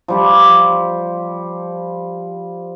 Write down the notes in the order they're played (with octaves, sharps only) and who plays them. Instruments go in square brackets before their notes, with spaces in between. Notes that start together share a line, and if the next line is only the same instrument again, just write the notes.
[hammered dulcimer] F3 G3 G4